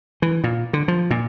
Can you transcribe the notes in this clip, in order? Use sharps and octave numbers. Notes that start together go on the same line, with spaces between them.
E3
A#2
D3
F3
A#2